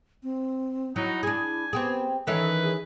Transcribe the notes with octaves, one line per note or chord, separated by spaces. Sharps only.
C4
F#3 D#4 E4
D4 G#4 G#5
B3 C4 G4 G#4
D#3 E3 C#4 A4 B4
G#4